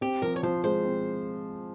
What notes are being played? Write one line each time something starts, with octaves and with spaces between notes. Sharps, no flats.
C4 G4
F3 A#4
C#5
F3 C5
G#3 C5
C4